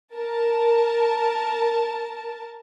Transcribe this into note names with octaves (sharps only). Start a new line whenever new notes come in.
A#4 A5